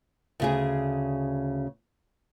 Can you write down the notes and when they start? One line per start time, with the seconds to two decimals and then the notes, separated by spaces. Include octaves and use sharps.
0.40 D2 C#3 G#4